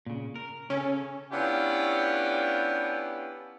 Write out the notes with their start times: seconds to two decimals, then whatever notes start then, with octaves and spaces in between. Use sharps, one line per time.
0.06 A#2 C#3
0.36 A#4
0.70 C#3 C#4 A4
1.32 B3 C#4 D4 E4 F4 G4